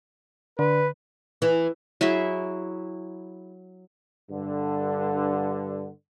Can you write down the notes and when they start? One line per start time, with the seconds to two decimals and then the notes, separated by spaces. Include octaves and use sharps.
0.59 D3 B4
1.42 E3
2.01 F#3 E4 G#4 E5
4.31 G2 D3